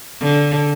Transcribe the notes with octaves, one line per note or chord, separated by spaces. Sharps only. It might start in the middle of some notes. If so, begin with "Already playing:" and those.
D3